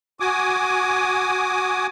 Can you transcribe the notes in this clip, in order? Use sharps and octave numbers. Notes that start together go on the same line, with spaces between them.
F#4 G#5 D6 D#6